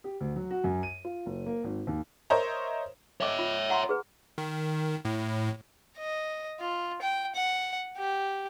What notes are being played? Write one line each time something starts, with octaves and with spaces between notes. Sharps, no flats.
G4
D2
F#3
F#4
F#2
D#7
F4
F#1
A#3
G#1
D#2
A#4 C5 C#5 D#5 E5 A#5
C#5 D#5 E5 D6
F4
F#5 A#5 C6
G#4 B4
D#3
A2
D#5
F4
G5
F#5
G4